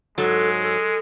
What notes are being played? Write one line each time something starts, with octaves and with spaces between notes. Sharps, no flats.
G#2 F#3 G#3 A4
A4